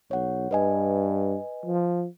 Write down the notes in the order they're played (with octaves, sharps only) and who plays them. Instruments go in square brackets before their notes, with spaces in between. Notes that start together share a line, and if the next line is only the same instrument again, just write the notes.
[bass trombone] B1 [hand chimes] C#5 F#5
[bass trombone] G2 [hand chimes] B4 D#5 G#5
[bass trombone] F3